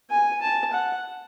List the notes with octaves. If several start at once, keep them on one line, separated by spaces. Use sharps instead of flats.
G#5
A5
F#5